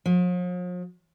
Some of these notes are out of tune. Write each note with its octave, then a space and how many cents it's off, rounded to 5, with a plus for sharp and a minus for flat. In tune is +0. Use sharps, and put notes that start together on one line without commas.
F3 +45